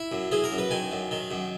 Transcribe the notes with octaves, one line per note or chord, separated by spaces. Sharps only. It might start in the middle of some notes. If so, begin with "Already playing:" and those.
Already playing: E4
F#2
E3 G#4
A#4
F#2
B4
D#3 G#5
F#2
D#3
F#2